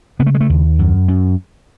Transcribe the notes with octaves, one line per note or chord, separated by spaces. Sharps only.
C#3 B3
A3
G#3
A3
D#2
F#2
F#2